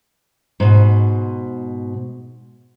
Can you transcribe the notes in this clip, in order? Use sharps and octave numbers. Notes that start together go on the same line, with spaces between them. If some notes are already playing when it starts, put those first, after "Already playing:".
G#2 B2